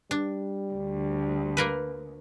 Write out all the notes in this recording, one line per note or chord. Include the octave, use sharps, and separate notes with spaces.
G3 D4
D2
A#3 A#4 B4